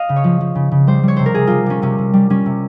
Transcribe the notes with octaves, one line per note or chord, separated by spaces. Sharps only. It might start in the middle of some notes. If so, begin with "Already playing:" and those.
Already playing: D#5 F5
C#3
C#5
F3
F3
C#3
C#3
G3 C5
G3 C#5
C3 C5
A#4
C3 G#4
G3 F4
G3 C#4
C3 C#4
C3
G3
G3 C#4
C3